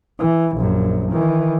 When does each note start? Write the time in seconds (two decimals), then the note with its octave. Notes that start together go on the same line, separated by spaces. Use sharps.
0.19 E3
0.56 A#1 F#2
1.12 D#3 E3